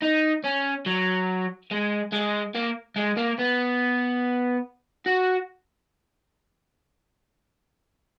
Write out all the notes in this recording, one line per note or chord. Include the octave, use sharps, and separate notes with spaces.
D#4
C#4
F#3
G#3
G#3
A#3
G#3
A#3
B3
F#4